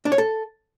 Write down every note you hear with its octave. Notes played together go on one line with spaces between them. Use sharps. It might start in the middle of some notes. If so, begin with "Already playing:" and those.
D4
C#5
A4